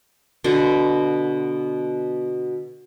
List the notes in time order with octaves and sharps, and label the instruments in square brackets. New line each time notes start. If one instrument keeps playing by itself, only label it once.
[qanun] B2 D3 B3